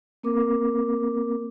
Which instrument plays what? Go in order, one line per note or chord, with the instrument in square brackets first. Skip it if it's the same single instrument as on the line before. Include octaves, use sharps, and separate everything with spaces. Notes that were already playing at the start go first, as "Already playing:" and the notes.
[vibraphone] A#3 C4 A#4 D6